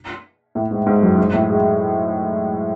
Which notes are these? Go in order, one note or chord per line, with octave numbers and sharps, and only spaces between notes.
A2
G#2
G#2
F#2
G#2
A2
G#3